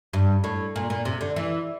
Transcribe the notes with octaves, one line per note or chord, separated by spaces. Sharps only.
G2
A2
A#2
A#2
C3
D3
E3